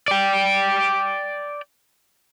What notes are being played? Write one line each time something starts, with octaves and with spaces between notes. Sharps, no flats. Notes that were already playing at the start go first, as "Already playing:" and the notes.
D5 G5